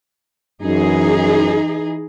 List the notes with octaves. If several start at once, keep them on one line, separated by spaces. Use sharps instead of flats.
F#2 E3 D#4 G#4